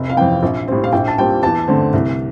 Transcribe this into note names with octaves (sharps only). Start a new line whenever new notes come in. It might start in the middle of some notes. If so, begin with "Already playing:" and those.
Already playing: F1
F5
F2 E3 G5
A#1
A2 G3 C4
F5
A#1 G5
A5
A#2 G3 C4 G5
E2 A5
D3 A3 C4
C2